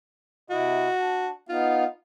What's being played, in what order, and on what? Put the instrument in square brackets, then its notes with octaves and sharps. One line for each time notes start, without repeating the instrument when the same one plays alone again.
[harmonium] C3 E4 D#5 [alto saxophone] F#4
[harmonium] D4
[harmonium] B3 D#4 F5 [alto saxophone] F4